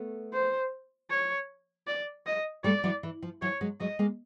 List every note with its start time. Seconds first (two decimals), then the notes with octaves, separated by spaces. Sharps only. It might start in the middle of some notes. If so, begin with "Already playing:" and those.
Already playing: A3 B3
0.33 C5
1.10 C#5
1.87 D5
2.26 D#5
2.64 G3 A3 D5
2.84 E3 F#3
3.03 E3
3.23 F3
3.42 E3 F#3 C#5
3.61 F#3 G#3
3.80 F#3 G#3 D#5
3.99 G#3 A#3